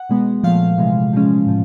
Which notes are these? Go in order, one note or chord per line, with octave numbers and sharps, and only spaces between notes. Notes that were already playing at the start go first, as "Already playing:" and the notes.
Already playing: F#5
B2 G#3 B3
A#2 F3 A3 F5
C3 E3 G#3
C#3 F3 G#3 C#4
A2 F3